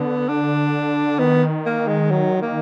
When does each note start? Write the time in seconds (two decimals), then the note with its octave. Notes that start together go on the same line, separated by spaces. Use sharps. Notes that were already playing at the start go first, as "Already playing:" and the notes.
Already playing: D3 B3
0.28 D4
1.19 D#3 B3
1.66 A#3
1.88 G#3
2.11 F#3
2.42 A#3